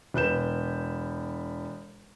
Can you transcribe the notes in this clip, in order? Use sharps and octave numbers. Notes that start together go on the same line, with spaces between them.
E1 B4 G6 E7